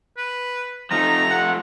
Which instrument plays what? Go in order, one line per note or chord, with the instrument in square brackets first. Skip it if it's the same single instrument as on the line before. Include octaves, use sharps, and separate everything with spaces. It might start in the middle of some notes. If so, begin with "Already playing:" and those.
[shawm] B4
[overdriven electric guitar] F3 A3 [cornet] D#4 [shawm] A#5
[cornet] F#5